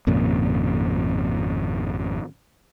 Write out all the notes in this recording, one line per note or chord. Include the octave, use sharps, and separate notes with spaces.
G#1 F2 A#2 C#3